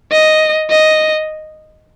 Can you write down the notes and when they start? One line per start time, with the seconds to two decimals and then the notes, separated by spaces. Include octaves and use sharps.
0.12 D#5
0.70 D#5